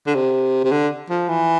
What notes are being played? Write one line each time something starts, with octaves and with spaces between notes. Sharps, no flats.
D3
C3
C3
D3
F3
E3